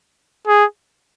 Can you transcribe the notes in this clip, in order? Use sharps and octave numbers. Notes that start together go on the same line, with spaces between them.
G#4